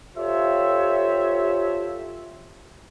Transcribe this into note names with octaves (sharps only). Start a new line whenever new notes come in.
F4 G4 A4 C5 C#5 E5